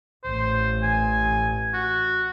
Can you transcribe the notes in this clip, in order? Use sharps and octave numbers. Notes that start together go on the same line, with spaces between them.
A1 C5
G#5
F#4